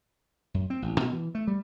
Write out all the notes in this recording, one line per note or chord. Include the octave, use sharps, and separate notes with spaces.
F#2
C4
A1
B2
E3
A3
G3